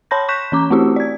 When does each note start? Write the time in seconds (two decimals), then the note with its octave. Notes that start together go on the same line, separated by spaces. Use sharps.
0.11 C#5 A5 B5 C6 G6 A#6
0.28 C#6 F#6 G6 B6 E7
0.52 E3 C#4 A#5 D6
0.70 A3 C4 E4 F#4 G4
0.96 D5 G#6